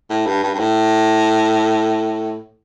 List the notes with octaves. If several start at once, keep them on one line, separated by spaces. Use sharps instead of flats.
A2
G2
G2
G2
A2